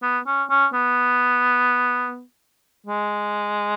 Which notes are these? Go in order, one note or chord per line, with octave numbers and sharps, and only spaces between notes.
B3
C#4
C#4
B3
G#3